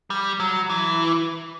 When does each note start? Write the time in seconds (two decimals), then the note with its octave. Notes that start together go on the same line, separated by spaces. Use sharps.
0.10 G3
0.40 F#3
0.70 E3